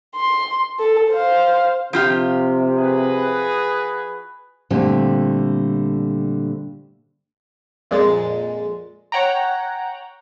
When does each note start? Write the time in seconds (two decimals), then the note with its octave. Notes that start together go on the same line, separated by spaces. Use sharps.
0.16 C6
0.79 A4
1.10 C5 F5
1.93 C3 F3 F4 G4
2.78 F#4 G#4 B4
4.70 A#2 D3 G3 A3 C4
7.91 F2 A#2 G#3 A6
9.12 C#5 F#5 G5 A#5